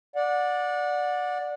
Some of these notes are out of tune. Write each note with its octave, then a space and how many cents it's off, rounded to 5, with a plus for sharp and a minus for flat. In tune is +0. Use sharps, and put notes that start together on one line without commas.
D5 +0 F#5 -25